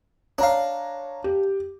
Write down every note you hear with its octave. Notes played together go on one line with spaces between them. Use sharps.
D4 C#5 F5 A#5
G4